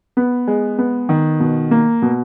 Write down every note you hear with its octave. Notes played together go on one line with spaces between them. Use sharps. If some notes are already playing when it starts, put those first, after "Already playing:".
B3
G#3
B3
D#3
B2
A#3
B2